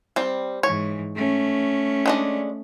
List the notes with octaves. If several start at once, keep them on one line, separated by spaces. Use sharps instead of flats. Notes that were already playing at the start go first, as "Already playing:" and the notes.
G3 C4
G#2 E3 C#5
A3 C#4
G#3 D4 D#5